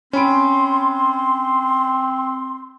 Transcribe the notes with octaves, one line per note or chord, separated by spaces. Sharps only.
C4 C#4 B5 C6 D7